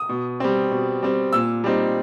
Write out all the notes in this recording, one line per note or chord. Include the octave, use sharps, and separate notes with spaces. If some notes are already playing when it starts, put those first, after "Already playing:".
Already playing: D#6
B2
G3 C4
B2
G3 C4
A#2 E6
G3 C4 D#4